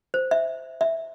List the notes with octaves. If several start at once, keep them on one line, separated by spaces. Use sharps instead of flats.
C5
E5
E5